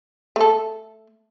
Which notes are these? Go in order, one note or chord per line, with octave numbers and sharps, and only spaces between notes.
A3 A4